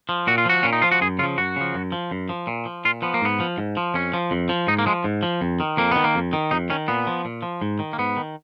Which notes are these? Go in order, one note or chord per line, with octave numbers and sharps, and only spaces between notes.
F3
A#2 F#4
F4
F3 F#4
A#2 C#4
D#4
F3 F4
F#4
F#2 G#4
C#3 F3 F4
F#2 F#4
C#3 F3
F#2
F3
F#2
F3
A#2
F3
A#2 F4
F3 B3
A#3
G#2 B3
F3
G#2
F3
F2 C#4
F3
F2
F3
G#2 D#4
A#3
F3 G#3
G#2
F3
F2
D#3
F2 A#3
D#3 B3
A#3
F2
D#3
F2 D#4
D#3 C#4
A#2 B3
F3
A#2
F3
G#2
D#3
A#3
G#2 B3
D#3